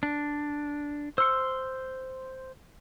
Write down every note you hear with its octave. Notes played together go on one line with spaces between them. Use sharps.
D4
C5 C6 E6 F6 C#7